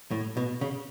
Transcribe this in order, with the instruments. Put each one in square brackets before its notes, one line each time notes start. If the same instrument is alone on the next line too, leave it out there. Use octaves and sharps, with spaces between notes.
[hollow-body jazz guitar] A2
B2
C#3